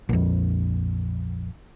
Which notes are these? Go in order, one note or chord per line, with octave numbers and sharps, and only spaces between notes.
A#1 F2